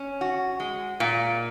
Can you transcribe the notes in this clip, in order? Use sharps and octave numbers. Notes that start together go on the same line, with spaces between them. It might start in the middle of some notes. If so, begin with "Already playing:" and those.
Already playing: C#4
F#4
G#3
A#2